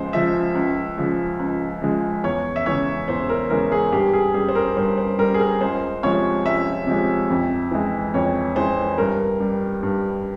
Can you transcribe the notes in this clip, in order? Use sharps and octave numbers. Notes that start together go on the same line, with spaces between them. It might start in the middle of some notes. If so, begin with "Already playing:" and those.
Already playing: C#2 F3 G#3 C5
C#3 F3 G#3 E5
C#2
C#3 F3 G#3
C#2
C#3 F3 G#3
E2 C#5
E5
C#3 E3 G#3 C#5
E2 C5
A#4
C#3 E3 G#3 A#4
G#4
G2 G4
G#4
G3 G#4
C5
A#4
G2 C5
C5
G3 A#4
G#4
A#4
C#2 C5
C3 F3 G#3 C#5
C#2 E5
C3 F3 G#3
F2
E3 G#3
F2 C#5
E3 G#3 C5
G2 A#4
G3
G2